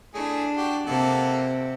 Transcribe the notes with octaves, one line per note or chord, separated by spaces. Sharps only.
A3 D4 E4 G#4
F#4 G4
C3 A#3 A4 F#5